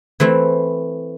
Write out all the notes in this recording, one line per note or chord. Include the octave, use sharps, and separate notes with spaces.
E3 A3 C4 E4